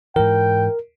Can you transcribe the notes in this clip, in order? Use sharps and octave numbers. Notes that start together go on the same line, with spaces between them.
G#2 E3 A#4 G5